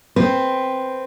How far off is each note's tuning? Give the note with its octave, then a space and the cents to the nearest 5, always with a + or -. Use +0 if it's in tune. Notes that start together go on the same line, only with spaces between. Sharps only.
C4 +0 B4 +0